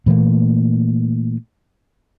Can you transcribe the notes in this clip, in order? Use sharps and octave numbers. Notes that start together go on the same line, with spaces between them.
A#2 E3 A3 A#3